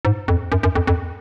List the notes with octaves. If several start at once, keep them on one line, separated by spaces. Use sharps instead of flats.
G#2
F2
F#2
F#2
F2
F2